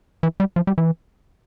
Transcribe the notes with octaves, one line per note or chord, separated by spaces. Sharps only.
E3
G3
F3
G3
E3